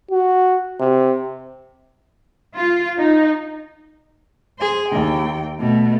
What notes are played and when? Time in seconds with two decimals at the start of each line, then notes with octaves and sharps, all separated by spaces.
0.11 F#4
0.80 C3
2.54 F4
2.99 D#4
4.59 G#4 C5
4.89 D#2 G5
5.60 B2 A3